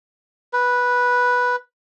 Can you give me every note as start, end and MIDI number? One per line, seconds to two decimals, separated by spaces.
0.53 1.56 71